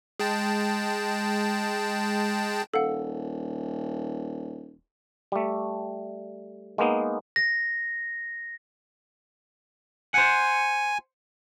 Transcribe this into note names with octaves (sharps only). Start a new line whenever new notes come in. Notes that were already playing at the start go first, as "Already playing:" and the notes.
G#3 G5 A5
D#1 A4 F5 F#5
G3 A3
G#3 A#3 B3 D#4
A#6
C5 F#5 G#5